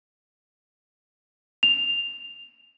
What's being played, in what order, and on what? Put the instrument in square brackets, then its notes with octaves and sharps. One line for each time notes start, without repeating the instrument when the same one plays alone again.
[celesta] F7